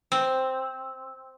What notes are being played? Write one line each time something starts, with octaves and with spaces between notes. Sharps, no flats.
C4